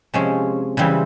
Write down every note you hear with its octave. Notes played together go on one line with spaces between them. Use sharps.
C3 F3 G#3 C#4
C#3 E3 G3 C4